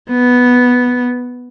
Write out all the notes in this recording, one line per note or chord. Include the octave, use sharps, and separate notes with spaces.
B3